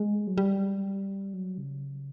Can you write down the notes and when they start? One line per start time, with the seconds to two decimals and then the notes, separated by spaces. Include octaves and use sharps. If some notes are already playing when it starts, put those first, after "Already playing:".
Already playing: G#3
0.27 F#3
0.38 G3
1.34 F#3
1.58 C#3